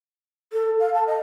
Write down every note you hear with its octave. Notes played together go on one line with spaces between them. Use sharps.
A4
F5
A5
D#5